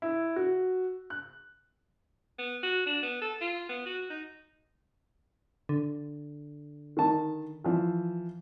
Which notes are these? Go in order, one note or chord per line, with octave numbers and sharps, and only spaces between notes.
E4
F#4
F#6
B3
F#4
D4
B3
A4
F4
B3
F#4
D#4
D3
D#3 A5
E3 F3